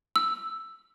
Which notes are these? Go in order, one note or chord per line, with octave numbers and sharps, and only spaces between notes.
E6